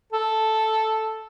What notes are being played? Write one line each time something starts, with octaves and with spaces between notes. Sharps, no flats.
A4